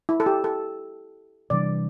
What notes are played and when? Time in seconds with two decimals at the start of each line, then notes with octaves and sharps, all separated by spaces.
0.09 E4
0.20 A4
0.26 G4
0.44 A4
1.50 C3 E3 G3 D4 D5